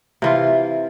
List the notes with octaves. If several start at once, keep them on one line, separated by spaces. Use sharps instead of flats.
C3 E3 F4